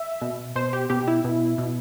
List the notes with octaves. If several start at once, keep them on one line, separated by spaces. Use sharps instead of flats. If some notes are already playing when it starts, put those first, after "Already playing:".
Already playing: E5
B2
B2 C5
G4
B2 G4
E4
B2
B2